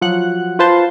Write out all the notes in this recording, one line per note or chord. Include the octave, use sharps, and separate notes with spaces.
F3 F#3 F#5 F#6
F4 B4 C5 A5 C6